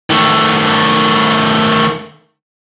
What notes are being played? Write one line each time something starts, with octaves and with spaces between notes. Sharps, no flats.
D#3 A3